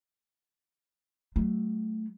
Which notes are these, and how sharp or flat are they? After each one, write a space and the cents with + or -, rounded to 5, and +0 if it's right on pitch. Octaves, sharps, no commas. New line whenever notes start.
F#3 +25 A3 -5